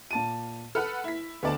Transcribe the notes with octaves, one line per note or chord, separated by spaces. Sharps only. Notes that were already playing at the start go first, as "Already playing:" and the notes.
A#2 A5 D#7
A4 B4 F#5 F6
E4 B6
D2 B3 D5 A5